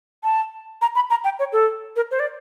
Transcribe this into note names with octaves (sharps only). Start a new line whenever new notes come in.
A5
A#5
B5
A#5
G5
C#5
A4
A#4
C5
D5